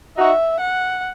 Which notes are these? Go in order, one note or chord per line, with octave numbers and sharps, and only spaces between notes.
D#4 F#4 E5
F#5